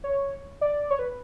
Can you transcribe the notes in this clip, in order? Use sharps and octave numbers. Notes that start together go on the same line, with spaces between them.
C#5
D5
C#5
B4